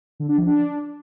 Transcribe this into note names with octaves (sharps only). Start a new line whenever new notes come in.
D3
D4
F3
D4